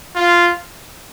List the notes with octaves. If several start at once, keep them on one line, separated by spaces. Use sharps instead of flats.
F4